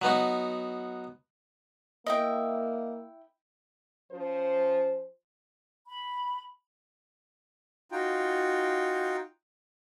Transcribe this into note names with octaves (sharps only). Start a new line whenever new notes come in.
F#3 B3 D#4 F#4
A#3 E4 D#5 E5 G5
F3 C#4 C5
B5
D#4 F4 F#4 G5